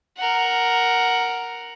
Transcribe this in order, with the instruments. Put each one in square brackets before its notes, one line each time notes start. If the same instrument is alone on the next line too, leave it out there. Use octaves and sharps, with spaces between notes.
[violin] A#4 F#5